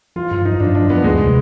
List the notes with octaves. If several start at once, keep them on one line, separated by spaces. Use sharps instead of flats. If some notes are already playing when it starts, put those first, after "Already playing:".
F3 F4
G2 F4
F3 D#4
G2 D4
F3 D4
F3 B3
D2 G#3
C3